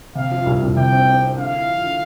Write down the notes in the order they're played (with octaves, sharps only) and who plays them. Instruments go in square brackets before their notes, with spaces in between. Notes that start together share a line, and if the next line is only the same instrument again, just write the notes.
[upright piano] C3 [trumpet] F5
[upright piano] F3
C2
C2
[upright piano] C3 [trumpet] G5
[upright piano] C4
C4
C4
[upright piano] D3 [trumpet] F5
[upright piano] E4
F3
D3